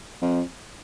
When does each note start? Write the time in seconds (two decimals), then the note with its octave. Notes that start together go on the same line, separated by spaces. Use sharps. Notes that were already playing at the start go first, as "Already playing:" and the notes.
0.22 F2